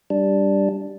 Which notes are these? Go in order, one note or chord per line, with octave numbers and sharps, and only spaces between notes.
G3 D4